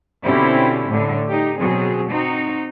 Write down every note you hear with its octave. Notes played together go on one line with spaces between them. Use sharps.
B2 D3 C4 C#4 E4 G4
A2 D3
D#4 G4
B2 F#3 C4 G#4
C4 D#4 F#4